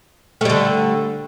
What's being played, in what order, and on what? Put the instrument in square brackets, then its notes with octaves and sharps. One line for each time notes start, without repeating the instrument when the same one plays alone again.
[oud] A3
G3
D3